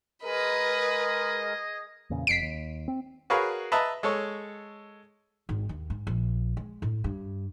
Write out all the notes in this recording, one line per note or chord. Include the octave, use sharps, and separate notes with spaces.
G#3 G#4 A#4 B4 D#5
E2 A#2 C#3
F1 F2 B6 C7 D7
D#2
C4
F#4 G#4 A#4 B4 C#5 F5
B4 D#5 E5 A5 A#5
G#3 A4 C#5
G#1
D#2
G#2
A#1
G#3
A2
G2